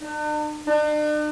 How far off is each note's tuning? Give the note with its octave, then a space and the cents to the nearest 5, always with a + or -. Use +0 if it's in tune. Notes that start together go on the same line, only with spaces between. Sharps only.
D4 +45
D4 +45